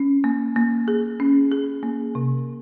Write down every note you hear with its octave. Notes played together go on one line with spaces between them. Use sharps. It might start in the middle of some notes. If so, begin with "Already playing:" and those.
Already playing: C#4
A#3
A#3
G#4
C#4
G#4
A#3
C3